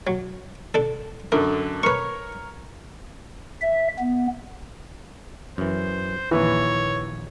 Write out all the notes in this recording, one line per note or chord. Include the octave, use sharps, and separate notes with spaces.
F#3
D4 A4
F#2 D3 A#4
A#4 B4 C#5 C#6
E5
B3
F#2 E3 C5
A#1 D#2 E3 B4 C#5